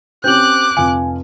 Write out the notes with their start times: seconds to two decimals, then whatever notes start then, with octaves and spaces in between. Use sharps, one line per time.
0.24 C4 C#4 G4 D6 F#6 G6 F#7
0.77 F1 F4 F5 G#5